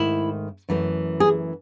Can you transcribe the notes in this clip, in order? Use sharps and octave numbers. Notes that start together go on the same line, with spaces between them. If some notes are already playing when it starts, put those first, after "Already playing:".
Already playing: G#2 D#3 A3 E4
F#2 E3 A3
G#4